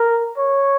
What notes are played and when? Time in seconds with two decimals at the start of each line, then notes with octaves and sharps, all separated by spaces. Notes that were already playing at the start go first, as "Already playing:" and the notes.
Already playing: A#4
0.38 C#5